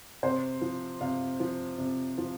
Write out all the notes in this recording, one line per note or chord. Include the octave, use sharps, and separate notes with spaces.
C3 C5
F3
C3 F5
F3
C3
F3